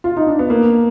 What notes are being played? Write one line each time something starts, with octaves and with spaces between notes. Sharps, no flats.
F4
D#4
D4
B3
A#3